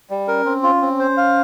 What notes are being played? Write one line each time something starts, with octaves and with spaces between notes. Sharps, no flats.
G3
C#4 A#4
C4
F4
C4
C5
F5